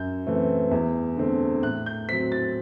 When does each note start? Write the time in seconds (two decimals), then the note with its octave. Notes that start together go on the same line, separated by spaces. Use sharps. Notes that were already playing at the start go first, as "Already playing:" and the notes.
Already playing: F#2 G6
0.27 E3 A3 C4
0.71 E2
1.17 D3 A3 C4
1.63 A2 F#6
1.86 G6
2.09 F#3 C4 B6
2.32 A6